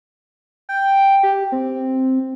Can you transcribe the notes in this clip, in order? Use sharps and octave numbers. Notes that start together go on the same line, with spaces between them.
G5
G4
C4